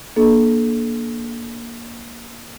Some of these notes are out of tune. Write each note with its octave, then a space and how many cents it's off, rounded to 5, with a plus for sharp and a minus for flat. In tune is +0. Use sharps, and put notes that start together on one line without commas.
A#3 +10 D4 +0 A4 -25